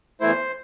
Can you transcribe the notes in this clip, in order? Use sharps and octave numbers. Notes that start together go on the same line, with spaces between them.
E2 E3 A3 E4 C5